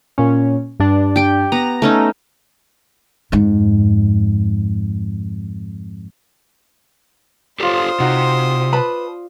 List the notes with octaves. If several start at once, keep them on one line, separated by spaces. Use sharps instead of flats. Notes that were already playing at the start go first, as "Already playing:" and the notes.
A#2 C#4
G2 D4
G4 G5
B3 A#5
A3 C#4 D#4
F2 G#2
F4 G4 A4 C5 D5 D#6
C3 D#4 F#4
B4 A5 B5